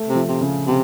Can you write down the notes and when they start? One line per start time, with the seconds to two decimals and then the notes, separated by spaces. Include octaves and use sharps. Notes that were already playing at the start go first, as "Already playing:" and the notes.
Already playing: A3
0.09 C3
0.15 F3
0.28 C3
0.41 C#3
0.68 C3